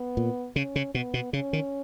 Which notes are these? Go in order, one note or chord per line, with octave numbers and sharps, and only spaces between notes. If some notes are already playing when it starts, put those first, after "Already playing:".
Already playing: B3
A#2
C#3 C#4
C#3
B2 B3
B2
C#3 C#4
D#3